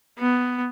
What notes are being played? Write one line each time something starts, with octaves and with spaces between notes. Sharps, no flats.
B3